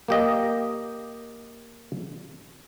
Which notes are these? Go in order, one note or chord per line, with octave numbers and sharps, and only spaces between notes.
A#3 G4 D#5